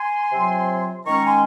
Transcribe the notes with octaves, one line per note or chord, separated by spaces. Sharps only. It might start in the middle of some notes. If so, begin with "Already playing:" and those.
Already playing: G#5 C6
C3 F#3 C4 F4
D#3 G#3 C#4 A#5 C#6
G#5 C6